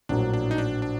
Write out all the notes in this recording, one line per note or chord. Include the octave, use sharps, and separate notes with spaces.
A#1 A2 F#3 A#3 D4
D4
D#4
D4
D4